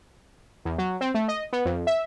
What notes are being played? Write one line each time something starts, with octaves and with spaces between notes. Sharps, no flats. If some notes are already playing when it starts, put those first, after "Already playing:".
E2
F#3
C4
A3
D#5
B3
F2
E5